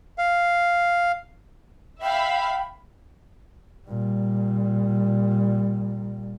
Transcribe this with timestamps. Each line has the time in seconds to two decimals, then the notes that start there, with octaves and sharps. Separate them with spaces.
0.18 F5
2.02 E5 F5 G5 B5
3.88 A#2 G3